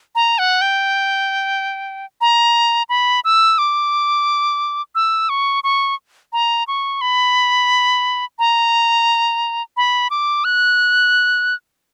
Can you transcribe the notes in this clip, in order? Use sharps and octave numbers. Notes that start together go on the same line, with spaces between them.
A#5
F#5
G5
A#5
B5
E6
D6
E6
C#6
C#6
A#5
C#6
B5
A#5
B5
D6
F#6